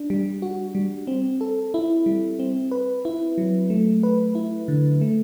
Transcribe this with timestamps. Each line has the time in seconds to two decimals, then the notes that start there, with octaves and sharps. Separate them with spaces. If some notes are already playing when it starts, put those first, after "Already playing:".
Already playing: D4
0.10 G3
0.42 F#4
0.75 G3
1.07 C4
1.41 A4
1.74 E4
2.06 G3
2.39 C4
2.72 B4
3.05 E4
3.38 F#3
3.70 A3
4.03 B4
4.35 E4
4.68 D3
5.02 A3